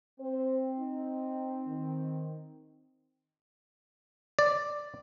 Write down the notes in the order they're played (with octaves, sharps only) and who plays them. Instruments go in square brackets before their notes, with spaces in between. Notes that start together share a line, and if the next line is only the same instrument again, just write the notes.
[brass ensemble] C4 [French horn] C5
[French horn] D#4
D#3
[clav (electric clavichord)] D5